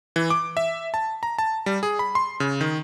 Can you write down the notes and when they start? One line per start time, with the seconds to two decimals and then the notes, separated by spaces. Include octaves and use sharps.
0.16 E3
0.30 D6
0.57 E5
0.94 A5
1.23 A#5
1.38 A5
1.66 G3
1.83 G#4
1.99 B5
2.15 C6
2.40 C#3
2.61 D#3